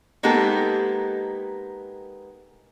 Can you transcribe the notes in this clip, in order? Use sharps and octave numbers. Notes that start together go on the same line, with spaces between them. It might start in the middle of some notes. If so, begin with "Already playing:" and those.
G#3 A#3 B3 D#4 G4 A4